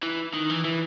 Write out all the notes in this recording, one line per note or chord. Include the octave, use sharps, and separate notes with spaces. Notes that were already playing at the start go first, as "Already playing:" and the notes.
E3
D#3
E3
E3